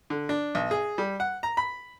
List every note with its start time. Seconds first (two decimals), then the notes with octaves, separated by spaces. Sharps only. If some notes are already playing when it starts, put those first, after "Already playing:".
0.10 D3
0.29 D4
0.55 B1
0.71 G#4
0.98 G3
1.20 F#5
1.43 A#5
1.57 B5